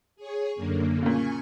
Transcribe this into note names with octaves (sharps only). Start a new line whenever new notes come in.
G#4 C#5
F#2 D3 A#3
A#2 C#3 G#5 C#6